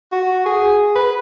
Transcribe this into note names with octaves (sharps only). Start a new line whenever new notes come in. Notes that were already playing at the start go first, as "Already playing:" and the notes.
F#4
G#4
B4